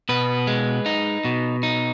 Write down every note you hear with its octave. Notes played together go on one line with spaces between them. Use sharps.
B2 B4
G#3
D#4
B2
D#4